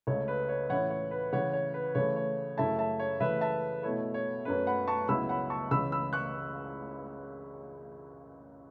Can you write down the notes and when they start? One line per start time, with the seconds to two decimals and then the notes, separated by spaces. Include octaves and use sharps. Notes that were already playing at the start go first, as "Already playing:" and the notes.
0.07 C#2 C#3 A3 C#5
0.28 B4
0.49 C#5
0.69 A2 E3 C#4 E4 C#5 F#5
0.90 C#5
1.11 B4
1.33 C#3 E3 C#4 C#5 F#5
1.53 C#5
1.74 B4
1.95 C#3 E3 A3 C#5
2.16 C#5
2.57 F#2 C#3 A3 E4 E5 A5
2.79 E5 A5
2.99 C#5
3.20 C#3 E3 A3 B4 E5
3.41 E5 A5
3.83 B2 A3 E4 C#5
4.14 C#5
4.45 F#2 F#3 A3 C#4 B4
4.67 F#5 B5
4.88 A5 C#6
5.08 C#2 C#3 F#3 B3 E4 B5 E6
5.29 F#5 B5
5.50 A5 C#6
5.71 C#2 C#3 E3 B5 E6
5.92 B5 E6
6.13 C#6 F#6